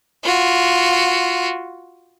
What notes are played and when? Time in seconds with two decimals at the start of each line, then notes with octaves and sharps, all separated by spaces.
0.24 F4 F#4